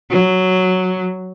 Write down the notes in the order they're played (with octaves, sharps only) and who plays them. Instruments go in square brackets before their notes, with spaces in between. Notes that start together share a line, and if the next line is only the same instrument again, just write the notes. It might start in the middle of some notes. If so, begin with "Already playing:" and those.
[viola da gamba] F#3